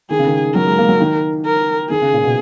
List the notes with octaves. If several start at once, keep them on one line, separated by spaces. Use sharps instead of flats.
D#3 G#4
C#3
D#3
F#3 A#4
G#3
A#3
F#3
D#3
A#4
D#3 G#4
C#3
A#2
B2